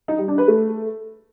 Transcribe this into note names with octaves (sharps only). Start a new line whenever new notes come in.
D#4
G3
D4
B4
A3